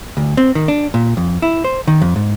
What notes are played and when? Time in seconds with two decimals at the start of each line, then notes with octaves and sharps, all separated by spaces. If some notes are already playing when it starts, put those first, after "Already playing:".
0.17 D2
0.37 C4
0.55 D#3
0.68 D4
0.94 A#2
1.17 F2
1.42 E4
1.64 C5
1.88 D#3
2.02 F2
2.16 G#2